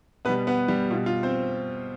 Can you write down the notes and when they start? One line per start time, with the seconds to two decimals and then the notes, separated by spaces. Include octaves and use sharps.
0.25 B2 G3 B3 B4
0.47 B3 B4
0.68 G3 G4
0.91 B2 F4
0.94 G3
1.06 F4
1.23 C4 C5